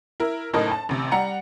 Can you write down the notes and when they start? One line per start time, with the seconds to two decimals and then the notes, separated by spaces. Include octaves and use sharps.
0.20 E4 A#4
0.53 F#1 A2 D#4 A#4 D#5 A5
0.71 A5
0.89 A1 C3
1.11 G3 F#5 A#5 C#7